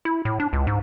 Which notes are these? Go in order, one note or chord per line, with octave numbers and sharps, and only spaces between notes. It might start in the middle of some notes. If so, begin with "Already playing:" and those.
E4
A2
D4
C#2
G#2